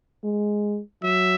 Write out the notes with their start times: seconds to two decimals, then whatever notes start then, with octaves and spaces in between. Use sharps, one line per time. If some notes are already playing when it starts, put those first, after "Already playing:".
0.24 G#3
1.03 F#3 E5